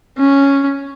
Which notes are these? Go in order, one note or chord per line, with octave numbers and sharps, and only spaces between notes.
C#4